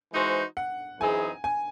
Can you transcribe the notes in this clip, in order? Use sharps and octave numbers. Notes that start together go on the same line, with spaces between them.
E3 G#3 D#4 F#4 C5
F#5
F#2 E3 C4 D#4 G#4 G#5
G#5